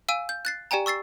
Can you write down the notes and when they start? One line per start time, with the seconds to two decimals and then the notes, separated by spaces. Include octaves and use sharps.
0.09 F5 G#5 E6 D#7
0.29 G6
0.45 F#6 A6 C7
0.71 G4 D5 G5 G#5 A#5
0.86 C#6 E6 A6 C7